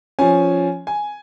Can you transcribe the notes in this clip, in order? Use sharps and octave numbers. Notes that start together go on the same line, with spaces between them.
F3 C#4 G#5
G#5